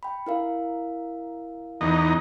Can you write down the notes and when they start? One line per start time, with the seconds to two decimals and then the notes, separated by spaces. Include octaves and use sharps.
0.03 G5 B5
0.26 E4 A#4 F5
1.81 E2 D#4